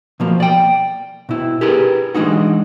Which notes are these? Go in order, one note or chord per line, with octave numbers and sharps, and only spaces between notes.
B2 F3 A#3
D5 G5
B2 E4
G4 G#4 A#4 B4
E3 G#3 D4 D#4 F#4